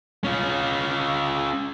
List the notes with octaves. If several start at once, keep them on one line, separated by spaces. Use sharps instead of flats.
C#4 F4